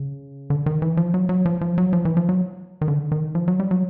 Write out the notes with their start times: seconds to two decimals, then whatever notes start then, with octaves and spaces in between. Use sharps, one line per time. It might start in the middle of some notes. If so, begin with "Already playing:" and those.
Already playing: C#3
0.50 D3
0.66 D#3
0.82 E3
0.97 F3
1.14 F#3
1.29 F#3
1.46 F3
1.61 F3
1.78 F#3
1.93 F3
2.05 E3
2.17 F3
2.29 F#3
2.81 D#3
2.88 D3
3.12 D#3
3.35 F3
3.48 F#3
3.60 G3
3.71 F#3